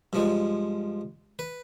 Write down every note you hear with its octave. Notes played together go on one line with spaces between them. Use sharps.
G2 F3 G#3
B4